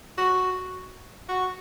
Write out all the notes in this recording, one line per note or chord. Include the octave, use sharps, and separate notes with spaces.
F#4
F#4